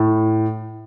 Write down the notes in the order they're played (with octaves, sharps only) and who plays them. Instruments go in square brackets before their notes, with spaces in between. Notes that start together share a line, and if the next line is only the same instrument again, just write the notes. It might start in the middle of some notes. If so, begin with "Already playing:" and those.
Already playing: [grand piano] A2